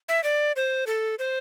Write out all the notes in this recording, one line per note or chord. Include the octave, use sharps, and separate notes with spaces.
E5
D5
C5
A4
C5